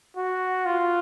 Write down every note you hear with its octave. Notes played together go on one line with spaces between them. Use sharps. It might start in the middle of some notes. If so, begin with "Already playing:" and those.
F#4
F4